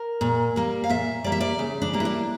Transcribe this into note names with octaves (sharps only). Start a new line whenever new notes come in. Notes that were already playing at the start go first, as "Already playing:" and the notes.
Already playing: A#4
A#2
G3 A#3
F5
A#2 E5
G3 A#3 D5
E5
D5
C#3
D4
G3 A#3
E4
D4